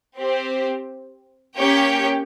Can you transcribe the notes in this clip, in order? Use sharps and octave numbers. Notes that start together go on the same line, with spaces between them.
C4 G4 C5
A#3 C#4 G4 C#5 G5